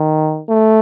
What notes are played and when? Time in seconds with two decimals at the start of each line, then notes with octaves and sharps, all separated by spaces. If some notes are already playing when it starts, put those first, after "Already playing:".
Already playing: D#3
0.49 A3